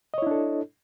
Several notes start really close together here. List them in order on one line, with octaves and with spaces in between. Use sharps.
D#5 C#5 E4 D4 A4